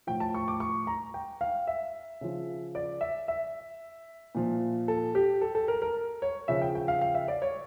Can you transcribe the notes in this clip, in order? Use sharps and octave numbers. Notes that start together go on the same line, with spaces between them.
A2 F3 G5
A5
C#6
D6
C#6
A#5
G5
F5
E5
C#3 F3
D5
E5
E5
A#2 F3
A4
G4
A4
A4
A#4
A#4
C#5
C#3 F3 E5
G5
G5
F5
F5
E5
D5
C#5